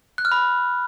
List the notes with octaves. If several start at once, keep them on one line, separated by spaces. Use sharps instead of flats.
F#6
F6
B5